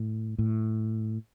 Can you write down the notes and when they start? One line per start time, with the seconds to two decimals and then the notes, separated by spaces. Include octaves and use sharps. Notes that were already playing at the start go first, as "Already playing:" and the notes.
Already playing: A2
0.39 A2